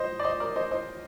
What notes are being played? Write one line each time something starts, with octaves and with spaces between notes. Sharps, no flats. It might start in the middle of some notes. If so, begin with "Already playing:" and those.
Already playing: C5 D#5
D5
C5 D#5
A#4 D5
C5 D#5
C5 D#5